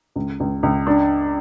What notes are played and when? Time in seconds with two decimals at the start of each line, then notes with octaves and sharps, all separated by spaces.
0.16 C#2
0.40 C#2
0.63 C#2
0.87 D4